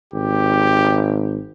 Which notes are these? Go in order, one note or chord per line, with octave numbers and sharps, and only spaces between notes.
G#1 G4